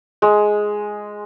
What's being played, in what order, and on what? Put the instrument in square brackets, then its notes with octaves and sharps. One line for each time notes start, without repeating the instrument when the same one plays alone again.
[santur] G#3